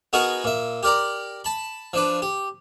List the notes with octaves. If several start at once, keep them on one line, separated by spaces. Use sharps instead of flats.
B3 D#4 F#4 G#4 A#4
A#2 E5
G4 A#4 D5 A#5
A5 B5
F3 D4 B4
G4